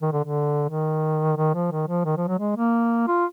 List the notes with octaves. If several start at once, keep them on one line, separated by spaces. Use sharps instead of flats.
D#3
D3
D3
D#3
D#3
F3
D#3
F3
D#3
F3
F#3
G#3
A#3
F4